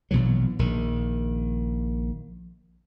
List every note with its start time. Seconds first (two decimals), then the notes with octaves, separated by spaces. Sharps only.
0.11 A#1 B2 E3 F#3
0.59 A#1 D#3